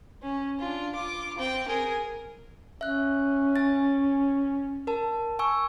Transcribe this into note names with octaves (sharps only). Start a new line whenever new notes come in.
C#4
D4 F4
F4 D6
C4 G5
G#4 A#4
C#4 E5 F#6
G#5 A6
A#4 A5
G#5 C#6 E6